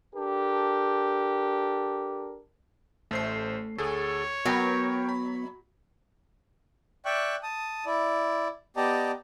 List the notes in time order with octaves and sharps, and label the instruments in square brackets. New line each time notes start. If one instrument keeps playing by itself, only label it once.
[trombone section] D4 G4 A4 A#4
[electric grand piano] A1 C5 C7 [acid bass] A3
[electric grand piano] D2 A4 [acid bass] G#4 [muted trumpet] C#5
[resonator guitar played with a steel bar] F#3 [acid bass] B3 [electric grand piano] A#4 G5 B5
[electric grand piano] B5
[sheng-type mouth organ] D5 E5 G5 C#6 F#6
A5 D#6
E4 D5
B3 G4 D5 D#5 A5 A#5